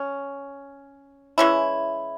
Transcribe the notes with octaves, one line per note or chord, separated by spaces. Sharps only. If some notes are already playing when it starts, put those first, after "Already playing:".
Already playing: C#4
E3 G#3 C#4 E4